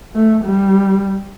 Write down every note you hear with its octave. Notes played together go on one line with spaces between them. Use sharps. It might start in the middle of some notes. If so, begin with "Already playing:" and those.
A3
G3